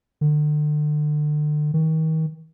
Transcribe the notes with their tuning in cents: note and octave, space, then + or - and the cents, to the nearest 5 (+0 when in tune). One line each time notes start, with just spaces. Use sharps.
D3 +35
D#3 +35